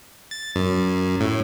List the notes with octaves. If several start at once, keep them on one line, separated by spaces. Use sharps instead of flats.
A6
F#2
A2